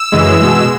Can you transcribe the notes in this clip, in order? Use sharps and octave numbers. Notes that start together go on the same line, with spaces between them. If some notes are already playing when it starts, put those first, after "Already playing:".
Already playing: E6
F#2 C#3 E3 G#3
B2 G#3